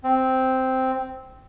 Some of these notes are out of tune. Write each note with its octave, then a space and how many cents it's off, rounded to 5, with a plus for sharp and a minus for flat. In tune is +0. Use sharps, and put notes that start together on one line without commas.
C4 -5